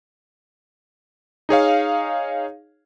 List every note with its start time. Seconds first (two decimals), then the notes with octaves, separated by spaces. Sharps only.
1.49 D#4 G#4 C#5 F5